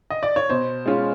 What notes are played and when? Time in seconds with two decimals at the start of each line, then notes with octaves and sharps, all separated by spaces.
0.10 D#5
0.23 D5
0.36 C#5
0.50 B2 C5
0.86 G#3 C#4 F4